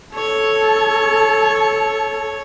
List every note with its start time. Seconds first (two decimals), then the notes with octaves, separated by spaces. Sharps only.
0.15 A4 C#5